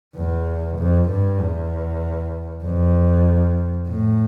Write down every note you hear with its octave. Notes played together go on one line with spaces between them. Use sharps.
E2
F2
G2
E2
F2
A2